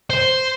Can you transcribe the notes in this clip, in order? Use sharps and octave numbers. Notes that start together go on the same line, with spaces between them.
C5